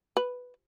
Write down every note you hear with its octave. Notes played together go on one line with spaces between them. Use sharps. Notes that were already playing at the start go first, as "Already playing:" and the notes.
B4